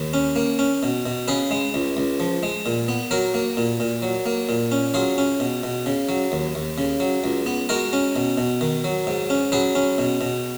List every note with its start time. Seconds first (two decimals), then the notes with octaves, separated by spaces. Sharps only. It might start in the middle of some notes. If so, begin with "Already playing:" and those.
Already playing: D#2
0.14 C#4
0.36 A#3
0.59 C#4
0.83 B2
1.06 B2
1.28 C#3 G#4 B4
1.51 G#3
1.74 C#2
1.97 C#2
2.20 F3
2.43 G#3
2.66 A#2
2.88 B3
3.11 F#3 F#4 A#4
3.34 A#3
3.57 A#2
3.80 A#2
4.02 F#3
4.26 A#3
4.49 A#2
4.72 C#4
4.94 F#3 F4 G#4
5.18 C#4
5.40 B2
5.63 B2
5.86 C#3
6.09 F#3
6.32 D#2
6.55 D#2
6.78 C#3
7.00 F#3
7.24 C#2
7.46 B3
7.69 G#3 F#4 A#4
7.93 C#4
8.16 B2
8.38 B2
8.61 D#3
8.84 F#3
9.07 G#2
9.30 C#4
9.52 F#3 G#4 B4
9.75 C#4
9.98 B2
10.21 B2